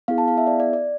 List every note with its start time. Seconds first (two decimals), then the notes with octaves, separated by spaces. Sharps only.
0.08 B3 E4 G#4 F5
0.18 A5
0.28 F5
0.38 E5
0.47 D5
0.60 D5
0.73 D5